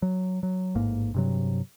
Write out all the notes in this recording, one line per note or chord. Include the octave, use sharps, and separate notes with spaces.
F#3
F#3
A1 G#2 A#3
G2 C3 F#3